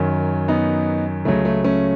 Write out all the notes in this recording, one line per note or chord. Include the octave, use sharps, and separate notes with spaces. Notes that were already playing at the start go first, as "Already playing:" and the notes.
Already playing: F#2 D#3 F#3
B3 D#4
C#2 C#3 F#3 A3
A3
A3 C#4